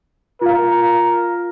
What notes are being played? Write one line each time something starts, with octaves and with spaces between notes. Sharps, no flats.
F4 A#4 F5